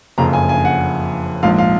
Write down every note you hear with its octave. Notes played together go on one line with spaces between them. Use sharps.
F#1 F2 C#3 F3 A#5
G#5
G#5
F#5
A#1 G#2 F3 F5
F5